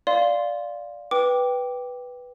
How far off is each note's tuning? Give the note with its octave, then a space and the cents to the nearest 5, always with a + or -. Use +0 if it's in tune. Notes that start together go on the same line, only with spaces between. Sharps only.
D5 +0 F5 +0 C6 +0
B4 +0 G5 +0 D6 +0